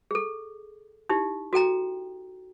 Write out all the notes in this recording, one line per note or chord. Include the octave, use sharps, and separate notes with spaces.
G#4 A4
D#4 E4 G4
F#4 A4 G5 A#5